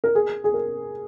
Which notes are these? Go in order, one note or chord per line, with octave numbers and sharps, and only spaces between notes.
A#4
G#4
G#4
A#4